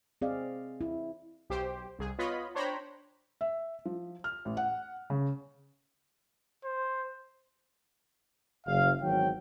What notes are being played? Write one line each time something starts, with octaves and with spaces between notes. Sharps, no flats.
C4 G#4 D5 D#5 F5
E4
B1 G4 C5
C2 G#4
B3 F4 C#5 D#5 B5
D4 C5 C#5 G5 A#5 B5
E5
F3
F6
A1
F#5
C#3
C5
F#1 F5
G#1 E2 D#3 F#3 G5